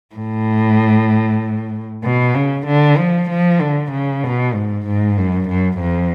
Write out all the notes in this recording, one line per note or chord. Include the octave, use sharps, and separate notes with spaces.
A2
B2
C#3
D3
F3
F3
D3
C#3
B2
G#2
G#2
F#2
F#2
F2